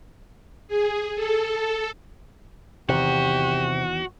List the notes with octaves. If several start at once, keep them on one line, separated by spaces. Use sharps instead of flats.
G#4
A4
E2 C3 D#3 E3 F#4 G4